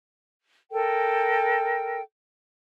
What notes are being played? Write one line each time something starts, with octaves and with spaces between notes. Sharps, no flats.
A4 A#4 G5